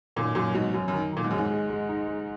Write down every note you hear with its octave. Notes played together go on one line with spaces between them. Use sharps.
F#2 A#2 D#3
F#2 A#2 F#3
G#2 B2 F#3
F#2 F#3
F#2 D#3
A#2 D#3
G#2
F#2 G#3
G#2
G#3
G#3
D#4
G#3